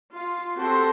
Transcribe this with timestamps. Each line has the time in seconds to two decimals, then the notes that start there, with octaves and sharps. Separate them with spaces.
0.15 F4
0.57 C4 F#4 G4 A4 C6